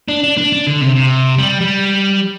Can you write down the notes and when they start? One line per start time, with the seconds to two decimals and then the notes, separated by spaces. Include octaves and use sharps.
0.08 D4
0.23 D4
0.37 D4
0.53 D4
0.67 D3
0.81 C3
0.95 C3
1.38 G3
1.61 G3